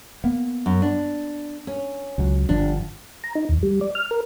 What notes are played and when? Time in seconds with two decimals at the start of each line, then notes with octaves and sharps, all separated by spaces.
0.24 A#3 B3
0.66 F#2
0.82 D4
1.67 C#4
2.18 C#2 F#3
2.49 G1 F3 D4
3.24 A#5
3.35 D#4
3.49 D#2
3.63 G3
3.81 D5
3.95 F6
4.11 A#4